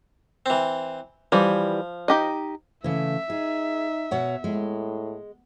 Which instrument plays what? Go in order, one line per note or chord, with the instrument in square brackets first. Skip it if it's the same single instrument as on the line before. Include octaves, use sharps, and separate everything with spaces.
[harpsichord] E3 C4
[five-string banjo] E3 G3 [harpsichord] F3
[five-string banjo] D#4 G4 D#5
[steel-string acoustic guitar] C#3 E3 [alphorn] A3 [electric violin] E5
[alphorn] D#4 [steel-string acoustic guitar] G#4
[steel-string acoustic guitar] B2 C#5 F#5
[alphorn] A2 [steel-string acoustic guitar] G#3